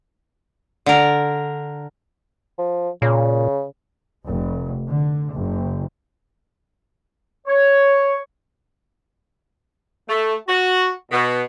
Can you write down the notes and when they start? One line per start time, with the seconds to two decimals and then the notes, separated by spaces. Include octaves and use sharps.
0.86 D3 A#4
2.58 F3
3.02 A#2 C#3
4.26 F1
4.87 D3
5.34 F#1
7.47 C#5
10.09 A3
10.48 F#4
11.11 B2